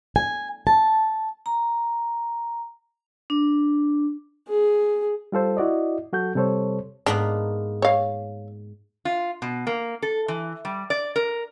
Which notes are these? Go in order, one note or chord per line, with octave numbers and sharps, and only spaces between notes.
G#5
A5
A#5
D4
G#4
G3 F4 A4 C5
E4 F#4 D5 D#5
F#3 F#4 A4 G6
C3 G3 A4 C5 C#5
G#2 A#3 B3 D4
C#5 F5
F4
B2
A#3
A4
E3
G3
D5
A#4